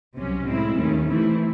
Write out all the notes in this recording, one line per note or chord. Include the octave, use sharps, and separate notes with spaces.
C2 C3 F#3 C#4
A2 G#3 C4 E4
D#2 D#3 A3 C#4
C3 E3 A3 C4 E4